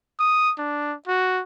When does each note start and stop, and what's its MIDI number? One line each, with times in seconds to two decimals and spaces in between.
0.19 0.53 87
0.58 0.94 62
1.08 1.42 66